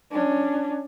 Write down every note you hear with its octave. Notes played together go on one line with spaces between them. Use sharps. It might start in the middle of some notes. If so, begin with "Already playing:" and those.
C#4 D4